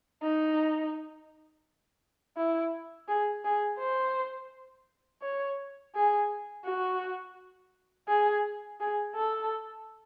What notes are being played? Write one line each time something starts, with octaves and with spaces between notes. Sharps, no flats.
D#4
E4
G#4
G#4
C5
C#5
G#4
F#4
G#4
G#4
A4